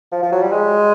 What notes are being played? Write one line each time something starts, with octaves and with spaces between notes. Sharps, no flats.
F3
F3
F#3
G3
G#3